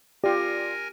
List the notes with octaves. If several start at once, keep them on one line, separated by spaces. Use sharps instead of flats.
F4 G4 A#4 D5 G#5 A#6